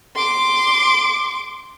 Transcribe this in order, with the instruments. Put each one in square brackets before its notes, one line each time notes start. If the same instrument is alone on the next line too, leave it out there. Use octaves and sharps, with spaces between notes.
[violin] C6 D6